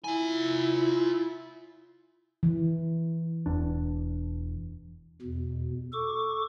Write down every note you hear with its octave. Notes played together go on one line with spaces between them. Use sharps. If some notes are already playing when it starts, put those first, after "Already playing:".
E4 F4 G#5
E3
E1 E2 D4
E2 B2
A4 C#6 D6